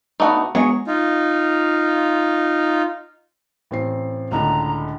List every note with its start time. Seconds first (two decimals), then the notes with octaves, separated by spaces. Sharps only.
0.20 A3 B3 D4 D#4 F#4
0.55 F#3 G#3 B3 G#4 C#5
0.87 D#4 F4
3.71 A1 C4 C7
4.31 C#2 A2 D3 A#5